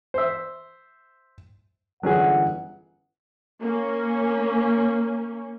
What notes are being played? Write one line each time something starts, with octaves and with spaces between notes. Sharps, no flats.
C5 E5
G1 E3 F#3 C#4 G#4 F#5
A#3 C#4